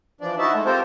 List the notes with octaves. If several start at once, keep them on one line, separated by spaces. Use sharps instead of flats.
E3 F3 D4 D5
D#4 E4 F#4 E5 A5
G#3 A3
C4 F4 G4 A4 A#4 C5